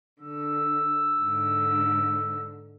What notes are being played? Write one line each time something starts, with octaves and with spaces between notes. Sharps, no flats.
D3 E6
G#2 D3